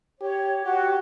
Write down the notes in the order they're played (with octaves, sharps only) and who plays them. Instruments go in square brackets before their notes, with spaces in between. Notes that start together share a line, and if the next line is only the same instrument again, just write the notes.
[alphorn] G4 [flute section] C#5
[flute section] F#4 [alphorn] G4